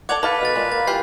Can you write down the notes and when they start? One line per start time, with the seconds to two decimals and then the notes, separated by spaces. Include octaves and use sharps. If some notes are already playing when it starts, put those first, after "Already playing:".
0.09 A4 D5 F#5 D6 G#6 F7
0.23 A4 B4 F5 A5 B5
0.41 B2 F6 A6
0.56 A#2 G#3
0.72 A#3 A6
0.87 E3 F4 G4 G6 C7